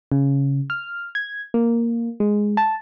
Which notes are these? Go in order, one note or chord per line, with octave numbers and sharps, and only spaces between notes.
C#3
F6
G#6
A#3
G#3
A5